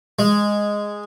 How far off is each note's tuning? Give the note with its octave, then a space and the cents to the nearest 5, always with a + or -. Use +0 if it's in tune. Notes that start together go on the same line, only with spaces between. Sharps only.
G#3 -5